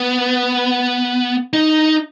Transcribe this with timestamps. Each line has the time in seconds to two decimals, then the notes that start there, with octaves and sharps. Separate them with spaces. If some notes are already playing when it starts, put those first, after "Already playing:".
Already playing: B3
1.53 D#4